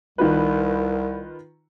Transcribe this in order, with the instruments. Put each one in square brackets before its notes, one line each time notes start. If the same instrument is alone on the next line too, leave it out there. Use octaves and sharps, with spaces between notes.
[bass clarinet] C2 [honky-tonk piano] D#3 F4 B4